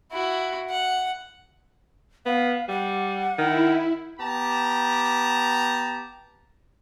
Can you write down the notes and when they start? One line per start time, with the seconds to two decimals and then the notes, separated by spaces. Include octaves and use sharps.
0.12 E4 F#4
0.70 F#5
2.26 B3 F5
2.69 G3 F#5
3.38 D#3 E4
4.20 B3 G4 A5 A#5